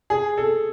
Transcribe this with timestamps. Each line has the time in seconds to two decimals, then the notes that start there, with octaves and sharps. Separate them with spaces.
0.10 G#4
0.38 A4